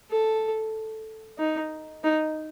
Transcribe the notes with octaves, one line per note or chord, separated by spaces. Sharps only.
A4
D#4
D#4